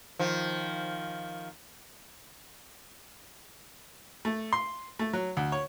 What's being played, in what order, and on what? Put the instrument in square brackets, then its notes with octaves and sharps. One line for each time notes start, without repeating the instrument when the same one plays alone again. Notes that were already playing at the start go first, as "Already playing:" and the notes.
[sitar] D#3 F3
[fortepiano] A3
C6
A3
F#3
D2
C#5